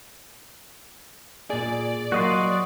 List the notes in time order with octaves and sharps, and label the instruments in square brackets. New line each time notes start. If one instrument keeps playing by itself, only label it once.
[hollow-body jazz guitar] A#2 G#4 [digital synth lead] D5
[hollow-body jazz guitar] F#3 A#3 [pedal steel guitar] F#4 D#5 C6